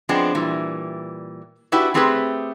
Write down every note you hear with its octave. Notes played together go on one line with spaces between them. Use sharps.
F3 G#3 B3 C4 D4
A#2 E3 G3
D4 E4 F#4 G4 B4
A3 C4 G4 G#4 A#4 B4